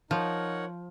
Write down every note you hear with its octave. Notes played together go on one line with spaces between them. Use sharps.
F3 D#4 A#4 C#5 F#5